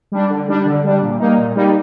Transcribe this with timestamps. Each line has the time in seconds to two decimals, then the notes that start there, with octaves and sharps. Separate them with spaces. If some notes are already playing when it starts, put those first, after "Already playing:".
0.12 G3 D4
0.30 D3
0.48 G3 D4
0.66 D3
0.84 G3 D4
1.02 A#2
1.19 G3 A#3 D#4
1.38 A#2
1.56 G3 A#3 D#4